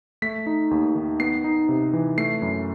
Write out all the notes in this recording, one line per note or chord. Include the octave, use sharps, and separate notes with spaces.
A3 B6
D#4
D#2
D#3
B3 C7
D#4
C3
E3
A3 C7
F#2